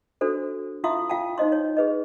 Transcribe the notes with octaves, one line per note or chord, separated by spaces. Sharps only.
D4 F#4 A4 C5
E4 F4 E5 F5 C6 D#6
F4 F5 G5 A5
D#4 C5 D#5 C6
C#5
G#4 B4 D#5